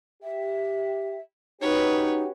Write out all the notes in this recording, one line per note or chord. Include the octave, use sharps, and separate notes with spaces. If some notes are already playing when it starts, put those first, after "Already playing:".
G4 E5
C#4 D#4 F#4 G4 B4 C#5